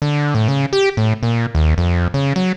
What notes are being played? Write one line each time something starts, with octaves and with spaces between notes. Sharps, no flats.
D3
A2
C#3
G4
A2
A#2
D#2
F2
C#3
F#3